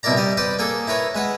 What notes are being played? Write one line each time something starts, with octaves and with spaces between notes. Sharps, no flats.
C2 B2 E4 A#4 D5 A#5
G3 D5 D#5
B4 C5 D5 A5
A#3 G#4 A4
E4 A#4 B4 C#5
G#3 B4 F#5